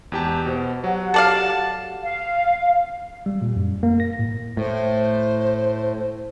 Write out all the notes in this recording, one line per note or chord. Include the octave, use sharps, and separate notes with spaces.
E2 G#2 B2 G4 A5
B2 C5
F#3 G4 F#5
A4 D5 F5 A5
F5
G3
A#2
F#2
A#3
A#6
A2
A2 C5